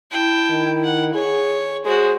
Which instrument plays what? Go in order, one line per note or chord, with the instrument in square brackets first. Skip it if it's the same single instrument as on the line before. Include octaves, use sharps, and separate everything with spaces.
[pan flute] E4 [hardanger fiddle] G5 A5
[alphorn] D#3
[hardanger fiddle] F#5
[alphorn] G#4 [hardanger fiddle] C#5 C#6
[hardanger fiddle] G#3 F#4 [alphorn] G#4 [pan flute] C5